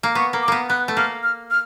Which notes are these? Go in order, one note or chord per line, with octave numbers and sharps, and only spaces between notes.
A#3
B3 C#6
A#3
D6
A#3 B3
B3 F#6
A3
A#3 F6
F6
F6